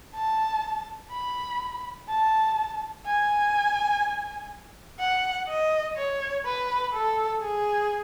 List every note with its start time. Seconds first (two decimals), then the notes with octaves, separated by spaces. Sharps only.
0.14 A5
1.11 B5
2.09 A5
3.05 G#5
4.99 F#5
5.48 D#5
5.96 C#5
6.45 B4
6.93 A4
7.42 G#4